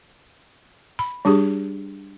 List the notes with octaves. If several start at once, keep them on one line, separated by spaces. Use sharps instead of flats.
B5
G3 D4 G4 G#4